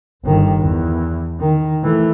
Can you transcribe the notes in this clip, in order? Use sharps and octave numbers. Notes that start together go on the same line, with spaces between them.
G1 D#3
E2
D#3
E3 A3